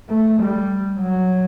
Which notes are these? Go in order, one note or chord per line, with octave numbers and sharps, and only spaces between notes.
A3
G3
F#3